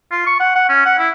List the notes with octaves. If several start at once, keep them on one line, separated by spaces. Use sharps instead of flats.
F4
C#6
F#5
F#5
C#4
F#5
E4